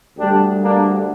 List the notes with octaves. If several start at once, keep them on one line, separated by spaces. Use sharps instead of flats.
D2 D3 G3 D4 G4
A#3 D4